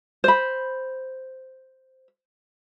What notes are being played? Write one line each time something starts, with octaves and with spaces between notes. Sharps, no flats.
C5 B5